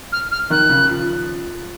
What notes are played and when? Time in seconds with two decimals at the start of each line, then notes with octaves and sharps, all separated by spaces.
0.12 F6
0.31 F6
0.50 D#3 F#6
0.70 C#3
0.89 F3